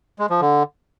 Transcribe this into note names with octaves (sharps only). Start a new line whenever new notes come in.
G#3
F3
D3